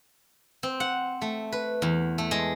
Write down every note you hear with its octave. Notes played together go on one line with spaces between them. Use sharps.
C4
F#5
A3
B4
E2
A3
G#3